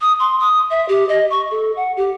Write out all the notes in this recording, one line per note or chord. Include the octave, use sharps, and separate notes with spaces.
D#6
C6
D#6
E5
G4
D#5
C#6
A4
F#5
G4